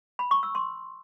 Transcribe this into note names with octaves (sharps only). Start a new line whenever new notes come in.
B5
C#6
E6
C6